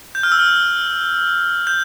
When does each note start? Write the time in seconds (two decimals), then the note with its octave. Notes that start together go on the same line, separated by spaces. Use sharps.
0.15 G6
0.23 F6
0.32 E6
0.39 F6
1.67 G6